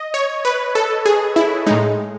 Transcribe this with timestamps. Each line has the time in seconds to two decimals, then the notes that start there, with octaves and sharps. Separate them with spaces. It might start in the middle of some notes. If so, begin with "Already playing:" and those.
Already playing: D#5
0.14 C#5
0.45 B4
0.75 A4
1.06 G#4
1.36 E4
1.66 A2 G#3 D#4